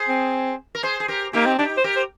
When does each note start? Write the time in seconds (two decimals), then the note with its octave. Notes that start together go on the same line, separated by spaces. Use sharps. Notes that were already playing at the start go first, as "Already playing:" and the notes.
Already playing: G#4 C5
0.08 C4
0.75 A#4
0.83 G#4 C5
1.00 G#4
1.08 G4 A#4
1.33 A#3 D#4 G4
1.46 C4
1.58 D4 D#4 G4
1.78 C5
1.84 G4 A#4
1.96 C5